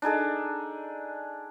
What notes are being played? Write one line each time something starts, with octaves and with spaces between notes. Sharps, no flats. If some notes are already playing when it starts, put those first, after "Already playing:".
D4 D#4 G#4 A4